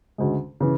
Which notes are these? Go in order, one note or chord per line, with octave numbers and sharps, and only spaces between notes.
D2 C#3 G#3
C#3 E3